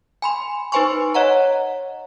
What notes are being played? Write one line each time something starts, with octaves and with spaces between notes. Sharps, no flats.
G#5 B5 C6
D#4 B4 C5 G#5 C6 C#6
C#5 D#5 F#5 A#5